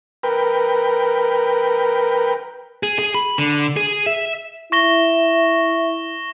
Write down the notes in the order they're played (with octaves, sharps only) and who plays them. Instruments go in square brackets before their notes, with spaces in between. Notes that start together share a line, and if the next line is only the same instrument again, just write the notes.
[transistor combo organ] A#4 B4 G5
[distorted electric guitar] G#4
G#4
B5
D3
G#4
E5
[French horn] E4 [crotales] C#6 A#6 G7